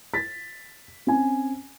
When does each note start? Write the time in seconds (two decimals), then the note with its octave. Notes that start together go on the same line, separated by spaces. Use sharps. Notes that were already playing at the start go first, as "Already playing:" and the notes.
0.14 A6 B6
1.07 C4 C#4 G#5